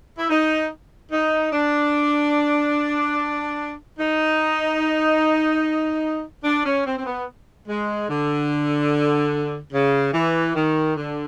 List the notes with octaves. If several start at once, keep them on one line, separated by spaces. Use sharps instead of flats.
E4
D#4
D#4
D4
D#4
D4
C#4
C4
C4
B3
G#3
D3
C#3
E3
D#3
D3